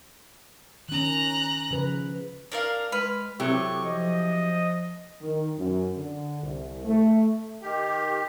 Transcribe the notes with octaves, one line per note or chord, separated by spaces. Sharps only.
D#3 C#4 A#5 F#6
C#3 F3 B4
D4 A#4 F5
G#3 B4 F6
C3 F#3 E4 G4 A4 C#6
F3 D#5
D#3
F#2
D3
C2
A3
D#3 G4